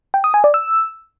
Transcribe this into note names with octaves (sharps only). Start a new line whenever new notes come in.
G5
D#6
G#5
D5
E6